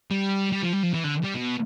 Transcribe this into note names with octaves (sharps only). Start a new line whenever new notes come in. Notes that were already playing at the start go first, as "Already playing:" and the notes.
G3
G3
F3
G3
F3
E3
D3
G3
B2